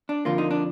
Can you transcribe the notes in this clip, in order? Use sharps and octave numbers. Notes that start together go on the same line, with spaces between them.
D4
F2 D3 F3 A#3 F4
D#4
D4